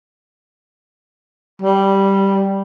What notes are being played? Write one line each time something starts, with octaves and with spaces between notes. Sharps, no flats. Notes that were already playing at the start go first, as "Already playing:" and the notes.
G3